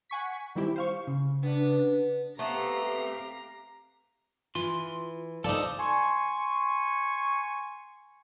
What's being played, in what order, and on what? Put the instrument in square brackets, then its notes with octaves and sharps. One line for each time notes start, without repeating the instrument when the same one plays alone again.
[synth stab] F#5 G#5 C#6 B6
D#3 G3 C4 E4 G4
C5 F5 C#6
[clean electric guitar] C#3
[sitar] B3 [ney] D4
[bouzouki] A3 B3 [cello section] C4 G4 F5 [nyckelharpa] A#5
[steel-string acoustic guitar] E3 [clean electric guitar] F4 C6
[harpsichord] F3 D5 D#6 [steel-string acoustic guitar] D#4 A5 [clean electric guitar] A4
[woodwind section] G#5 C6 C#6